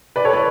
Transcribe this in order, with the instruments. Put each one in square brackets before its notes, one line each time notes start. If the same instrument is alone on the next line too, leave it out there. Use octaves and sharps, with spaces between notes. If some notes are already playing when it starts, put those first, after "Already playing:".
[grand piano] B4 D5
A4 C#5
B4 D5